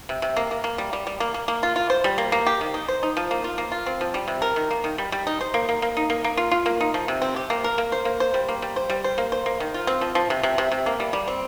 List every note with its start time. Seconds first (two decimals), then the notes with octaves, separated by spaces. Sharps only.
0.09 C3
0.22 C3
0.36 A#3
0.51 A#3
0.64 A#3
0.78 G3
0.93 G3
1.07 G3
1.20 A#3
1.34 A#3
1.48 A#3
1.63 F4
1.76 F4
1.90 C5
2.04 G3
2.18 A#3
2.32 A#3
2.47 G4
2.61 D#3
2.74 D#4
2.88 C5
3.03 D#4
3.17 F3
3.31 A#3
3.44 F4
3.58 A#3
3.72 F4
3.86 C4
4.01 F3
4.14 G3
4.28 C3
4.42 A#4
4.56 D#3
4.71 A#3
4.84 D#3
4.98 G3
5.12 G3
5.27 D#4
5.41 C5
5.54 A#3
5.69 A#3
5.82 A#3
5.97 D#4
6.10 A#3
6.24 A#3
6.37 F4
6.51 F4
6.66 A#3
6.81 D#4
6.94 F3
7.08 C3
7.22 C4
7.36 G4
7.50 A#3
7.64 A#4
7.78 A#3
7.92 C5
8.05 A#3
8.20 C5
8.34 G3
8.48 A#3
8.62 G3
8.76 C5
8.90 G3
9.04 C5
9.18 A#3
9.32 C5
9.46 A#3
9.60 D#3
9.74 F4
9.87 C4
10.01 F3
10.15 F3
10.30 C3
10.43 C3
10.58 C3
10.72 C3
10.86 A#3
11.00 G3
11.13 G3
11.28 C4